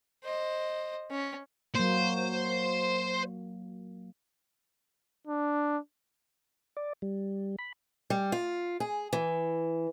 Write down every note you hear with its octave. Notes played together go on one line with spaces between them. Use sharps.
C5 D#5
C#4
F#3 A#3 C5
D4
D5
G3
B5
G3
F4
G#4
E3